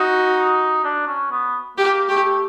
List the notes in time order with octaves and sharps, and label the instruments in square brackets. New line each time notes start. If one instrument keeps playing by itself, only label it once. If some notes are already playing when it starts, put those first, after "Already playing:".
Already playing: [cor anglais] D#4 [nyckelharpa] F#4
[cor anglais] D4
C#4
B3
[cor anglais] A#3 [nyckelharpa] G4
[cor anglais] A3 [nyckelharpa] G4